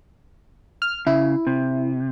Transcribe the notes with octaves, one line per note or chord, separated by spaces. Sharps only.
F6
C#3 E4
C3